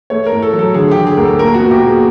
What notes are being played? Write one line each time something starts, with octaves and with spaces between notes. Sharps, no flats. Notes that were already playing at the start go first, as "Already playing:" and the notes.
A3 C#5
A#4
A2
A4
F#3
A4
D3 G#4
D3 G4
G#4
D2 A#4
A4
A#2 A#4
F#4
B3
G4
A#2
G#4